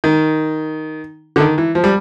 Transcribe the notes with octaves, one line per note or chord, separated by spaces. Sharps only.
D#3
D3
D#3
E3
F3
G3